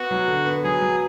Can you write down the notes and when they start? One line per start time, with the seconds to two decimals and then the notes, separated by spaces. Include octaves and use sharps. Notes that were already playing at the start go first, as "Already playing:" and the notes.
Already playing: B3 F#4
0.11 F#3
0.28 D3
0.45 B3
0.64 F#3 G#4
0.81 F#3